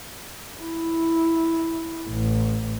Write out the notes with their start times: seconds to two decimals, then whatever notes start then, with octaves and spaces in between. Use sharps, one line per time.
0.61 E4
2.09 A1